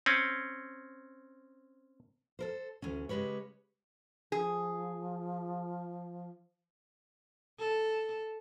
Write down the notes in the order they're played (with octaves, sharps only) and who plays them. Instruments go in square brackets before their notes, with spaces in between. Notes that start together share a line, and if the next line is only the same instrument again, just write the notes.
[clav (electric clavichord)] C4 C#4
[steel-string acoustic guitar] A4 A#4 C5
D2 E3 C#4
C#3 G#3 G4 B4 C#5
[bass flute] F3 [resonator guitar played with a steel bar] G#4
[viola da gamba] A4